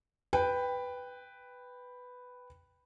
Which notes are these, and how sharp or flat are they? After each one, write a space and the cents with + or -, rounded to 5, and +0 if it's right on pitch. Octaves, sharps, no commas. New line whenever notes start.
B4 +5 G5 +10